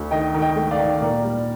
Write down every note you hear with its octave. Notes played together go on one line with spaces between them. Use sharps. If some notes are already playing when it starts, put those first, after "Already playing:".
Already playing: D2
D#3 D#5 G5
D#3
D#5 G5
A3
D5 F5
D#3
A#2 A#4 D5
G3